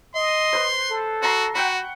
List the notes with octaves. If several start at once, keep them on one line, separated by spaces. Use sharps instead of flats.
D#5 C6
B4 C5
A4
F#4 A#5 C6 C#6
F#4 F#5 G5 B5